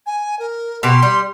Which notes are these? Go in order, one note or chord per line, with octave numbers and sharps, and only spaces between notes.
G#5
A#4
B2 G4 C6
G3